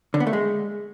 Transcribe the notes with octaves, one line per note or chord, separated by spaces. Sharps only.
D3
B3
A3
G#3